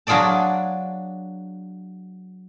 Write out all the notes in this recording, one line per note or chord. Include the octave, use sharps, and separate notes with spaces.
F#3 D4 F4 G#4 D5 A5